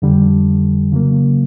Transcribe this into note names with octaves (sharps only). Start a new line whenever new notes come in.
F2 D3 G3
C#3 F#3 A#3